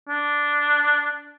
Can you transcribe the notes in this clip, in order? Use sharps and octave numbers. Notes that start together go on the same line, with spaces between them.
D4